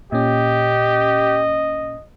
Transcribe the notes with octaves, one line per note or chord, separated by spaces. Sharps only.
A#2 C#4 G4 D#5